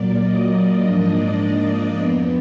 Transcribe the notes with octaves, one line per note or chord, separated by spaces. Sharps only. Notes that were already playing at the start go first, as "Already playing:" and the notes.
Already playing: A#2 F#3 A#3 D5
D#5
G#2 F3 A#3 D4 D#5
D5
F2 F3 B3